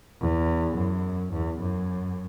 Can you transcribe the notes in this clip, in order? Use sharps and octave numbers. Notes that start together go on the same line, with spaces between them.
E2
F#2
E2
F#2